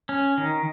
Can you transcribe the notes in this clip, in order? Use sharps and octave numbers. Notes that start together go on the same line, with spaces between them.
C#4
D#3